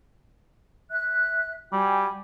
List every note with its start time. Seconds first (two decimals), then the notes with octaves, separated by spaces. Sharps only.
0.91 E5 F#6
1.72 G3 F#4 G5 G#5